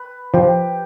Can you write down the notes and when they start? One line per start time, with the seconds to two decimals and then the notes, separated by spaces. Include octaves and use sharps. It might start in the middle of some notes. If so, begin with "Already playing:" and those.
Already playing: B4
0.34 F3 G4